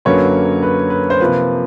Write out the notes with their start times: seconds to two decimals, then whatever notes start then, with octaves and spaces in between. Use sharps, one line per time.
0.05 F#2 D3 F#3 A#3 B4 C#5
0.63 B4
0.90 B4
1.10 C5
1.20 C3 F3 A#3 B4